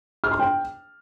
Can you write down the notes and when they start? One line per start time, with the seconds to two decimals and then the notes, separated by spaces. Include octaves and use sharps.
0.24 F6
0.31 C6
0.39 G5